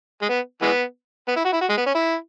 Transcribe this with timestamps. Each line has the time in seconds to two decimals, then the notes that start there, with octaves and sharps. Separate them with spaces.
0.22 G#3
0.29 B3
0.62 E3 G#3 B3
1.28 B3
1.36 E4
1.45 F#4
1.53 E4
1.61 F#4
1.69 G#3
1.77 B3
1.86 C#4
1.95 E4